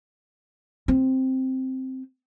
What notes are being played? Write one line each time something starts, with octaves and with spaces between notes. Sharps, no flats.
C4